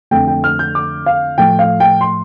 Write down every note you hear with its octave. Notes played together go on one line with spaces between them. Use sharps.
F2 D3 A3 G5
G5
F6
G6
D6
F5
A2 F3 A3 G5
F5
G5
C6